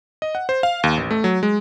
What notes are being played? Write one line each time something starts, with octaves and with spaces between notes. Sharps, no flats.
D#5
F#5
C5
F5
D#2
A1
A3
F#3
G#3